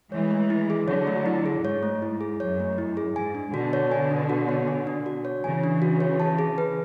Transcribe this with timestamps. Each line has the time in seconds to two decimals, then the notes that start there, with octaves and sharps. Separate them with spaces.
0.12 E3 G#3 C#5
0.31 A3
0.50 E4
0.70 G#4
0.88 D3 F#3 C#5
1.07 A3
1.26 E4
1.46 G#4
1.64 G#2 C#5
1.83 A3
2.02 E4
2.21 G#4
2.40 F#2 C#5
2.60 A3
2.78 E4
2.97 G#4
3.16 G#2 G#5
3.35 D4
3.54 B2 D3 F#4
3.73 C#5
3.92 G#5
4.11 D4
4.30 F#4
4.49 C#5
4.68 G#5
4.87 D4
5.06 F#4
5.25 C#5
5.44 C#3 E3 G#5
5.64 D4
5.82 F#4
6.00 C#5
6.20 A5
6.39 G#4
6.58 B4